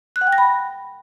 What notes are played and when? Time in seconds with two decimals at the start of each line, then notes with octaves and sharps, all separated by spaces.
0.16 F#6
0.21 F#5
0.27 G5
0.33 A#6
0.38 B5